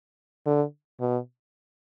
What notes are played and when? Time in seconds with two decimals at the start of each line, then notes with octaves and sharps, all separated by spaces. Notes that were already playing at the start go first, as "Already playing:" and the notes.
0.46 D3
1.01 B2